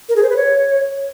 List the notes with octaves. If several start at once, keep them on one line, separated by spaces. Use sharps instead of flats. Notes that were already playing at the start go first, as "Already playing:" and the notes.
A#4
G#4
C5
B4
C#5